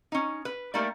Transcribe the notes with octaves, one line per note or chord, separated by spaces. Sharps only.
C#4 D#4
B4
G3 A3 A#3 D#4 D5